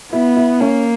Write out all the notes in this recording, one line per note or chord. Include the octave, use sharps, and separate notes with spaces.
B3 E4
E4
A#3 C#4